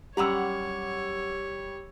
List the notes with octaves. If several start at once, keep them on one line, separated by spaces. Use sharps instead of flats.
F#2 G3 G4 C#5 F#5 A#5 E6